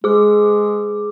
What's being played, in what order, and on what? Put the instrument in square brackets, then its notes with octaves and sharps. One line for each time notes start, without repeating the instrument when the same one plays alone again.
[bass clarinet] G#3 [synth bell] G#4 D6